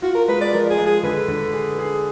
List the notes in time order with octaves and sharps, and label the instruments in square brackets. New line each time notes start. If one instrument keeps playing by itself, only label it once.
[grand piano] F4 [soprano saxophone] F#4
[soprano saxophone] A#4
[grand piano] G#3 [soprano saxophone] B4
[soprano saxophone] D5
[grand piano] F3 [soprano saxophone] A#4
[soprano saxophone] G#4
[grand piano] G#3
[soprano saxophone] G#4
[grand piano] D3 [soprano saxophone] B4
[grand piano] D3
G#4
G#4